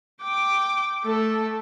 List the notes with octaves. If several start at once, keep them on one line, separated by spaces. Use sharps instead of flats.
G5 D6
A3 A4